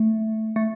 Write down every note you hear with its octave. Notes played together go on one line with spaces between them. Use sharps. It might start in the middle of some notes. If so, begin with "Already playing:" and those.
Already playing: A3
A3